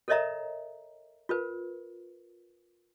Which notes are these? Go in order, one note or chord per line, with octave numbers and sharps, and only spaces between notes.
A4 A#4 C#5 D#5 E5 A#5
F4 A#4 B4